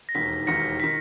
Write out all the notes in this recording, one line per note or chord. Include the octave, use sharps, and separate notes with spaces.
A#6
E1 D#2 D#3 B6
E1 D#2 D#3 A#6 C#7
D#3 B6